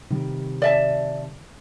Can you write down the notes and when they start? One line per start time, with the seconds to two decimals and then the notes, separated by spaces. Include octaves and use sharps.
0.10 C3 D#3 G3
0.62 D5 E5 A5